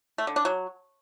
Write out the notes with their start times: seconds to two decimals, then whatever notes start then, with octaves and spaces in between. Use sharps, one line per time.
0.18 A3
0.27 D3
0.36 D4
0.45 F#3